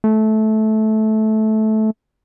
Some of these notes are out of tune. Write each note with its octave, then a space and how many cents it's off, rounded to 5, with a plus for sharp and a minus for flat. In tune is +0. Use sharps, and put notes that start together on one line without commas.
A3 -15